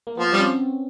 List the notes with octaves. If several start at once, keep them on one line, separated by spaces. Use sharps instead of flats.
A#3
F3 B3
G3 C4
C#4